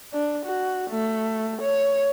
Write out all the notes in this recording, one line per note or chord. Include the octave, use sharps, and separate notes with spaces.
D4
F#4
A3
C#5